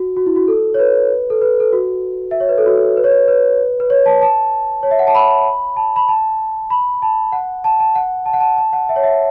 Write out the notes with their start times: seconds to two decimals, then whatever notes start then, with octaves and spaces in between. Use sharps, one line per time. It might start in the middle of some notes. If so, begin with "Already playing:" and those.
Already playing: F#4
0.16 F#4
0.26 E4
0.36 F#4
0.48 A4
0.74 C#5
0.79 B4
1.30 A4
1.42 B4
1.60 A4
1.73 F#4
2.31 E5
2.40 C#5
2.49 B4
2.58 A4
2.66 F#4
2.97 B4
3.04 C#5
3.11 B4
3.28 B4
3.80 B4
3.90 C#5
4.06 A5
4.22 A5
4.83 C#5
4.91 E5
4.99 F#5
5.07 A5
5.15 B5
5.77 A5
5.96 B5
6.08 A5
6.70 B5
7.02 A5
7.32 F#5
7.64 A5
7.80 A5
7.95 F#5
8.26 A5
8.33 F#5
8.40 A5
8.58 A5
8.73 F#5
8.89 E5
8.96 C#5
9.04 E5